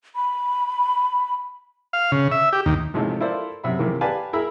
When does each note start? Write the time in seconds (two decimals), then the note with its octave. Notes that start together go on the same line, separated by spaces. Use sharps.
0.16 B5
1.93 F5
2.12 C#3
2.32 E5
2.53 G4
2.66 D#2
2.94 A1 C3 F3 G#3 A3 D#4
3.20 E4 F4 A4 A#4 C5 D5
3.64 F#2 C3 E5 B5
3.79 C3 D#3 E3 A#3
4.01 G4 B4 D5 F5 G#5 A5
4.33 E4 G#4 A#4 E5 A#5 B5